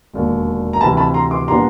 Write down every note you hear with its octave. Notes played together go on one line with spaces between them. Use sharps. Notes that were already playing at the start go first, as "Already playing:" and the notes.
E1 D#2 D3
A#5
D2 C3 E3 A5 B5
A5 B5
A#5 C6
C6 D6
A#2 G3 B3 D4 A#5 C6